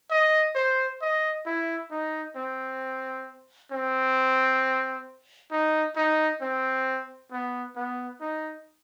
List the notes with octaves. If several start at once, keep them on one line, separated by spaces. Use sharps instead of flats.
D#5
C5
D#5
E4
D#4
C4
C4
D#4
D#4
C4
B3
B3
D#4